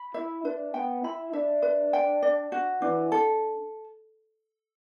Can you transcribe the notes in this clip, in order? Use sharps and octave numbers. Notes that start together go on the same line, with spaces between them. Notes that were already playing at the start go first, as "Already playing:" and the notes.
Already playing: B5
E4 E5
D4 B4
B3 G5
E4 B5
D4 E5
B4
G5
D5
F#4
E3 D4
A4